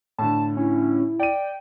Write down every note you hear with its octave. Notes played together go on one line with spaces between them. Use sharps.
A2 D3 A5
C#4 E4
D5 G5 D#7